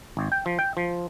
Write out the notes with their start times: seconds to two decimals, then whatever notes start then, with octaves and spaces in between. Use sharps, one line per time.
0.17 G#1
0.32 G5
0.46 F3
0.59 G5
0.77 F3